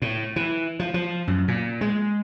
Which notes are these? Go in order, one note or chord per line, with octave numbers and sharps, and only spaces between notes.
A2
E3
F3
F3
F#2
A#2
G#3